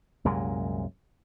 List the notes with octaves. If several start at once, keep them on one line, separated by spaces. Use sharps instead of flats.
C2 F#2 A#2 G#3